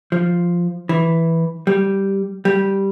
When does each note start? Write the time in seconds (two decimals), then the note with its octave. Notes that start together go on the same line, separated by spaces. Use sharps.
0.12 F3
0.89 E3
1.67 G3
2.45 G3